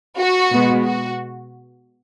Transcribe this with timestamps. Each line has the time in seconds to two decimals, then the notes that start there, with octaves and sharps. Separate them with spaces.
0.18 F#4
0.52 B2 G#3 B3
0.85 F#4